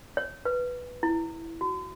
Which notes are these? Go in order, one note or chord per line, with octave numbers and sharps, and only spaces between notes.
C#5
B4
E4
F#4